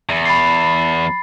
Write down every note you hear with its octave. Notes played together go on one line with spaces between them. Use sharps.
E2
B5 A6 C7